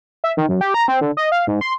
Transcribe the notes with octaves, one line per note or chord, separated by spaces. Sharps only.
E5
D#3
F#2
G4
A#5
C4
D3
D#5
F5
G#2
C6